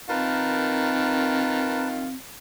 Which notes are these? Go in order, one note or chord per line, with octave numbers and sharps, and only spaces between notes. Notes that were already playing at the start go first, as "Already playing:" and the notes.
D#3 C4 F4 A#4 B4 A5